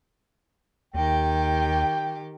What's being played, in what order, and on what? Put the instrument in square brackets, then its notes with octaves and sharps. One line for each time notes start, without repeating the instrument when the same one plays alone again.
[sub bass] D#2 [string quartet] D#3 G4 [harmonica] G5